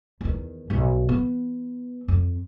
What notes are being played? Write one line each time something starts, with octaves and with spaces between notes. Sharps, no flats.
E2 D#3
B1 G2
E3 B3
F2